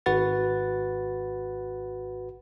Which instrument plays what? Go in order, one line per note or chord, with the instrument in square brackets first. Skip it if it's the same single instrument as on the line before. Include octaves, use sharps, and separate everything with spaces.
[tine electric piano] G#1 F#4 B4 F#5 A6